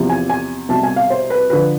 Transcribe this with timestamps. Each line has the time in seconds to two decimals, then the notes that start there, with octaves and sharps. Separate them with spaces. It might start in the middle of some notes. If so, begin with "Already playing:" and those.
Already playing: E2 C3 F3
0.10 G#5
0.30 G#5
0.69 C2 B2 A5
0.83 G#5
0.96 F5
1.10 C5
1.30 B4
1.50 D3 F3 B4